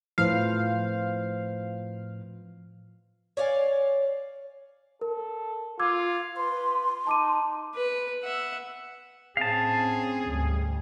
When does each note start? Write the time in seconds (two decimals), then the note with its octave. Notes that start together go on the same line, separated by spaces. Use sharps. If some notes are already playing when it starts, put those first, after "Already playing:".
0.18 A2 F3 B4 C5 F5
3.37 C#5 D5 F5 G#5
5.01 A4 A#4
5.80 F4 D6 E6 G#6
6.37 B4 C6
7.07 D#4 A5 D6 D#7
7.75 B4
8.23 E5 F#5
9.37 A2 C4 C#4 G#4 F5 A5
10.28 D2 G#2 G3